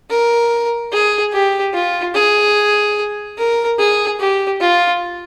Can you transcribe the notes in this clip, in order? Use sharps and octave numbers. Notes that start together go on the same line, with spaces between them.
A#4
G#4
G4
F4
G#4
A#4
G#4
G4
F4